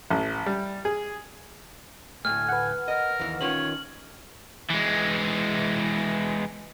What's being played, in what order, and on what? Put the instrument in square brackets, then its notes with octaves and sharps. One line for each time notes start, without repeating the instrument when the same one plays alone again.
[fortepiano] A1
G3
G#4
[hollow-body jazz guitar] D2 A2 A3 [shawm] G#5 [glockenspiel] F6
[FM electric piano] B4 F#5
[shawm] A#4 [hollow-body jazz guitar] D#5
[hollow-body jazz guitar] D#2 E3
[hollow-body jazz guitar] D#3 C#4 F4 [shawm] C#5 [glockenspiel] F#7
[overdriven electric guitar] E3 G#3